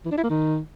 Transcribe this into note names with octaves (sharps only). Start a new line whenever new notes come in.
E3
D4
E4
A#3
D#3